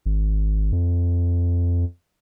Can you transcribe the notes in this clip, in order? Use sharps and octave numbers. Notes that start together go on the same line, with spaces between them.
G#1
F2